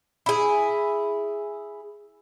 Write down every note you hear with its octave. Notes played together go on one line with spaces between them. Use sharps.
E4 G#4